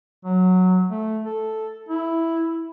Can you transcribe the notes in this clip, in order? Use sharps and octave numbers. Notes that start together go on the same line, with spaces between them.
F#3
A3
A4
E4